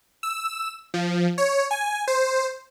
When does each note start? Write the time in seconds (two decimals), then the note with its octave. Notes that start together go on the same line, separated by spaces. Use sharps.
0.23 E6
0.94 F3
1.38 C#5
1.71 G#5
2.08 C5